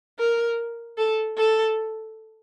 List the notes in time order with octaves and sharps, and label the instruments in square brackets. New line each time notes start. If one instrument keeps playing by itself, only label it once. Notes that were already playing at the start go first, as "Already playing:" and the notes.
[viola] A#4
A4
A4